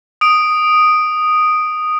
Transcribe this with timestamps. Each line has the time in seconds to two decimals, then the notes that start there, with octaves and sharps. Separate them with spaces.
0.21 D#6 D7